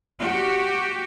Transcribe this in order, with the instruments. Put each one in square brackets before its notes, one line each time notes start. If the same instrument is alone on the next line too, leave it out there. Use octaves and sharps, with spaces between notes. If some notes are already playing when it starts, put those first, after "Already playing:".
[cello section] F#4 G4